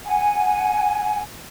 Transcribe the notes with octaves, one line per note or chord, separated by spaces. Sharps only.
F#5 G#5